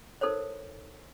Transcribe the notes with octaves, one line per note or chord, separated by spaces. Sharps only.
D#4 A4 A#4 C5 C#5